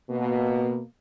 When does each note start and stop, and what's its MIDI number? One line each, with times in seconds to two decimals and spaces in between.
0.10 0.81 47
0.10 0.81 58